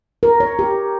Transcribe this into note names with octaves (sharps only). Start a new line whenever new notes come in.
A#4
C#5
G4